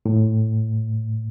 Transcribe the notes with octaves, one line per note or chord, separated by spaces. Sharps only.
A2